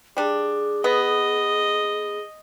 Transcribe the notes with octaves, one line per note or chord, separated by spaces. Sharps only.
G3 D4 G#4
B3 D#5